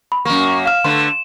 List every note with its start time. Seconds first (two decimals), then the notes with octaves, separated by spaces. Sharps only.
0.12 B5
0.25 F#2 A#3 C#6
0.66 F5 F6 E7
0.84 D3 A3 B4 C6